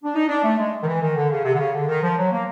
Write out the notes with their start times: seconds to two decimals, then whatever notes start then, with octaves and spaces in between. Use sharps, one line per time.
0.03 D4
0.15 D#4
0.28 D4
0.43 A3
0.58 G#3
0.83 D#3
0.87 E3
1.01 D#3
1.16 D3
1.30 C#3
1.44 C3
1.54 D3
1.59 C#3
1.73 D3
1.87 D#3
2.02 F3
2.17 F#3
2.31 A#3